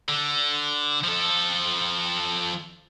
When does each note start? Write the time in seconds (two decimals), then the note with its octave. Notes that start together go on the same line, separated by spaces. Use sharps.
0.08 D3
1.04 F3 A4